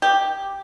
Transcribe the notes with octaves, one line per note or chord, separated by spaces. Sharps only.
G4